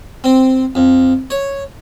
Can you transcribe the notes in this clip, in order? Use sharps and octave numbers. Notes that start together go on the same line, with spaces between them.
C4
F2
C#5